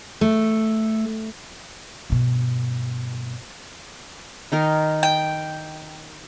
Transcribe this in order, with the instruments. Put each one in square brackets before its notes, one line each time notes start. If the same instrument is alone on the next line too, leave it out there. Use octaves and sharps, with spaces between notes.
[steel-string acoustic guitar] A3
[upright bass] G2 B2
[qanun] D#3 D#4 A#4
[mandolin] G5